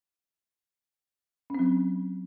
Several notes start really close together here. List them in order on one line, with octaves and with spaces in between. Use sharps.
C#4 C4 F#3